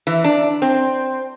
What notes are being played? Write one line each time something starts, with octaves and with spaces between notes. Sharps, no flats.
E3
D4
C4